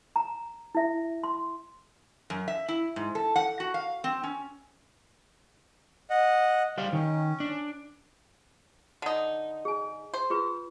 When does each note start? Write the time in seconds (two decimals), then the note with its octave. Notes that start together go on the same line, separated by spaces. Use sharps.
0.16 A#5
0.75 E4 E5
1.23 C6
2.30 F#2
2.48 E5
2.68 E4
2.96 G#2
3.15 A4
3.36 F#5
3.60 F#4
3.74 F5
4.04 C4
4.23 C#4
6.10 D#5 F#5
6.78 G3 C5 F5
6.93 D#3 C#4
7.40 D4
9.02 D3 D#4
9.65 G#4 G#5
10.14 C5
10.30 F4 G#4 B4